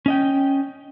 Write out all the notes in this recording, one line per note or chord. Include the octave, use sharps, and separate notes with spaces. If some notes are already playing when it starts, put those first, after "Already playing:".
C#4 D#5 G5